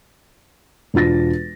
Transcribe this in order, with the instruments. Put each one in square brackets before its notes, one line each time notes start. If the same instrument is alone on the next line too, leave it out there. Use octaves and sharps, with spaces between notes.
[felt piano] E1 D4 F4 A6 A#6